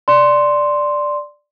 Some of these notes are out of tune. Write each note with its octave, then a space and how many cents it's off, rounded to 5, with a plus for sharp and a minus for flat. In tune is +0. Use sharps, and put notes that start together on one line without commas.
D5 +0 C6 +0